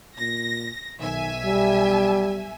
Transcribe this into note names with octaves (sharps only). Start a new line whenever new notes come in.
A#2 A#6
B1 D#3 E5 G#5
G3